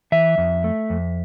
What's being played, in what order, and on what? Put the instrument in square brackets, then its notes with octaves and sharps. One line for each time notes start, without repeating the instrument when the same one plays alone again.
[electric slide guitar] E3 E5
F2
A3
F2